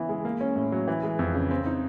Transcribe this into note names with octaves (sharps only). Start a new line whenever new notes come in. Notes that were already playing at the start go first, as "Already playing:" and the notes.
Already playing: C#3 E3 B3 E4
G#3
A#3
C#4
A2
F#3
E3
G#3
F2
C#3
C4
D#4